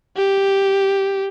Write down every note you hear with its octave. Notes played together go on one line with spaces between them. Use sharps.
G4